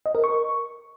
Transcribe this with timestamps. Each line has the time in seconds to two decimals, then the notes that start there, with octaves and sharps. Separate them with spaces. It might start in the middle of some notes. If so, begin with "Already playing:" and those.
0.06 D#5
0.15 A#4
0.24 C#6